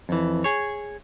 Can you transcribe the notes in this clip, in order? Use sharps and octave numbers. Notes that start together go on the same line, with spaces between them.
F2 E3
G#4 C#5